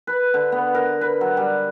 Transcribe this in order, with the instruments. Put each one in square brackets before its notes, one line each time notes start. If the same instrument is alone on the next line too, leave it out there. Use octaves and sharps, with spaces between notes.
[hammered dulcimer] B4
D3
B3
A#4
B4
F#3
G3